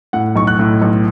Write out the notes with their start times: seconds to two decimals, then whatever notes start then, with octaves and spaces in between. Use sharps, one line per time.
0.13 A2 F#5
0.36 B1 C#6
0.47 F#6
0.59 A2
0.82 B1